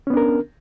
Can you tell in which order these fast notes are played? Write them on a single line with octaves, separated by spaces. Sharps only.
C#4 B3 D4 A#4